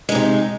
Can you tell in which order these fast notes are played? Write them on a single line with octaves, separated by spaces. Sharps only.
G#3 D#4 C3